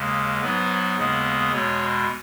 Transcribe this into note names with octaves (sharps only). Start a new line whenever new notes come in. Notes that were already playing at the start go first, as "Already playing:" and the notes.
Already playing: D#2 C#3 G#3
G#2 F#3 B3 B4
D#2 C#3 G#3 B3
E2 B2 G#3 C#5